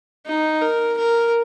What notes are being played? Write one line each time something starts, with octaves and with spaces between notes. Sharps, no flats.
D#4
A#4
A#4